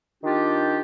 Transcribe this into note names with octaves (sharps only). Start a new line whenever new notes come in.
D#3 D4 F4 G4